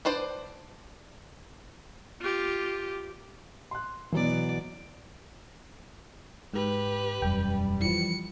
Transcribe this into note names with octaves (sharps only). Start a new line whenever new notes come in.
D4 B4 C5 D5
F4 G4
C6 F#6
B2 E3 F#3 B3 D5
G#2 G4 B4
E1 F#2 G3 G5
E3 F3 C#7